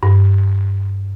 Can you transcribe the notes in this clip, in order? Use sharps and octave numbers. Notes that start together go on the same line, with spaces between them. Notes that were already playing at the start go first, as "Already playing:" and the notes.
G2